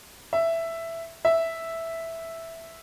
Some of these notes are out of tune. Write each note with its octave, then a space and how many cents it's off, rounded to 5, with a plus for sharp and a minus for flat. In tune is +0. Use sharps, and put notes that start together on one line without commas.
E5 +10
E5 +0